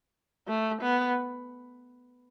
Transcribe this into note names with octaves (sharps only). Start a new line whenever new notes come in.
A3
B3